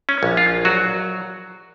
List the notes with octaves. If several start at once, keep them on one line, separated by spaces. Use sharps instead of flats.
C#4
A#1
F4
F#3 F#4